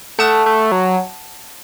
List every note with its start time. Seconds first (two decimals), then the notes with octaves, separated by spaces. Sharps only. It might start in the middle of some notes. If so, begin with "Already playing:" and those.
0.19 A3 F#5 A5 D#6 F#6
0.46 A3
0.72 F#3